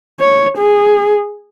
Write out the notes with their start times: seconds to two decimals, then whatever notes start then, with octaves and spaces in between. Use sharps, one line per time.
0.20 C#5
0.58 G#4